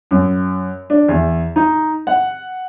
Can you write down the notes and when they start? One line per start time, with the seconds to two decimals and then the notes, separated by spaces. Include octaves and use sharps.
0.11 F#2
0.90 D4
1.08 E2
1.56 D#4
2.07 F#5